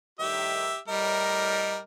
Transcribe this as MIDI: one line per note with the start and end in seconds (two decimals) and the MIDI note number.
0.20 0.71 45
0.20 0.71 51
0.20 0.71 55
0.20 0.78 67
0.20 0.78 76
0.88 1.79 45
0.88 1.79 55
0.88 1.79 70
0.88 1.79 75